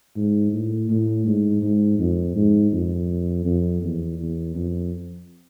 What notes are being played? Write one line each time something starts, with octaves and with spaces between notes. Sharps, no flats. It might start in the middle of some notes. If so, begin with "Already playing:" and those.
G#2
A2
A2
G#2
G#2
F2
G#2
F2
F2
E2
E2
F2